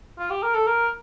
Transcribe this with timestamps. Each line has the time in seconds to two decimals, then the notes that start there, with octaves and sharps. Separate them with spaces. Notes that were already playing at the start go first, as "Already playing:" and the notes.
0.19 F4
0.30 G4
0.43 A#4
0.54 A4
0.67 A#4